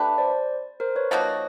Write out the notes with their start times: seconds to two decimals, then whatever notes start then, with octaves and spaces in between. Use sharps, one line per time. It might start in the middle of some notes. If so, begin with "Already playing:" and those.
Already playing: A3 D4 G4 B4
0.18 C5 D5
0.80 A#4 C5
0.96 B4 C#5
1.11 F3 A#3 D#4 F#4 C#5 D#5